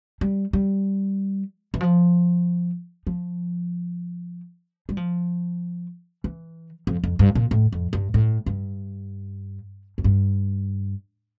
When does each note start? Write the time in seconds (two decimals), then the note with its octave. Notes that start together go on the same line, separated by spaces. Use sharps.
0.21 G3
0.53 G3
1.74 E3
1.81 F3
3.07 F3
4.89 G3
4.97 F3
6.24 E3
6.87 F2
7.04 F2
7.19 G2
7.35 A#2
7.51 A2
7.72 F2
7.93 G2
8.14 A2
8.46 G2
9.98 F2
10.04 G2